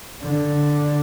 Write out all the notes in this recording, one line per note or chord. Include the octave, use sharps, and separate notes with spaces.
D3